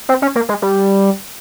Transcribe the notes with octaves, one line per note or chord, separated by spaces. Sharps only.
C4
C#4
A#3
G#3
G3